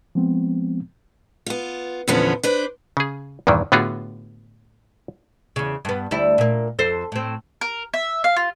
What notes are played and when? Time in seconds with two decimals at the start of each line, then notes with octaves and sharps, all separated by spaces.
0.15 F3 G#3 B3 C4
1.46 B3 F4
2.08 E2 A#2 D3 F3 B3 C#4
2.43 D4 B4 C5
2.97 C#3 G#4
3.47 E2 G2 A#2 D#3 E3
3.72 A2 D3 B3 F4 F#4 G#4
5.56 E2 C#3
5.85 G2 B3
6.11 D2 G3 E4
6.38 A#2 A#3
6.79 F2 A4 C5
7.12 A2 C4
7.61 A#4
7.94 E5
8.24 F5
8.36 F4